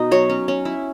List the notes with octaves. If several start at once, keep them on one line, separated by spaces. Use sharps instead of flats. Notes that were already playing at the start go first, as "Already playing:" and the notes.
Already playing: B2 B3 D#4 D#5
F#3 C#5
C#4
C#4
E4